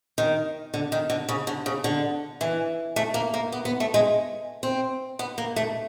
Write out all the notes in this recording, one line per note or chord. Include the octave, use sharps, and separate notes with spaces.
D#3
D3
D#3
D3
C#3
D3
C#3
D3
E3
A3
A#3
A#3
B3
B3
A3
G#3
C4
B3
A#3
A3